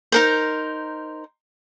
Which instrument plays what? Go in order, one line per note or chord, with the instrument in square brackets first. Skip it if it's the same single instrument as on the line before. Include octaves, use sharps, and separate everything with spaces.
[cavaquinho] D#4 A#4 C5